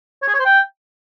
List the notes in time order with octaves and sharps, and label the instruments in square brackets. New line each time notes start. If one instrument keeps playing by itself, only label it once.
[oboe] C#5
G#4
C#5
C5
G5